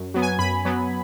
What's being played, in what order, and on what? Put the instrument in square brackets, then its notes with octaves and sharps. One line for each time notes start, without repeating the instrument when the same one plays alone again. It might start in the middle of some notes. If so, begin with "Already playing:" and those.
Already playing: [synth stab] F#2
F#3 B3
G#5
F#2 B5
F#3 B3